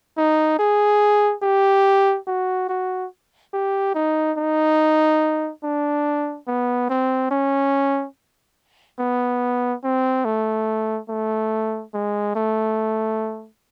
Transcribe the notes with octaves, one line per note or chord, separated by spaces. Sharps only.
D#4
G#4
G4
F#4
F#4
G4
D#4
D#4
D4
B3
C4
C#4
B3
C4
A3
A3
G#3
A3